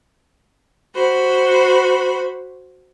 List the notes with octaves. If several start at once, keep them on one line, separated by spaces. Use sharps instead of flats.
F#4 C5 B5